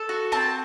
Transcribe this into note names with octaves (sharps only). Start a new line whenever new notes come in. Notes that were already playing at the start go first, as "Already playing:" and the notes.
Already playing: A4
F#4
C4 A5